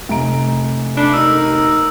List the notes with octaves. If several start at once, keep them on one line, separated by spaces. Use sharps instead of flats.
F1 A#5 D7
D4 A4 B5 D6
D#4 A#4 E6